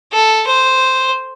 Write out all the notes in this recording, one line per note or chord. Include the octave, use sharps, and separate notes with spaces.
A4
C5